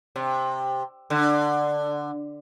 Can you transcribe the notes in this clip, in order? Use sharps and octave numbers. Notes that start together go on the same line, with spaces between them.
C3
D3